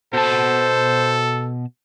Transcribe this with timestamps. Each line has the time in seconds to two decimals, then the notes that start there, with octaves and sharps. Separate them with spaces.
0.14 B2 A4 C5 A5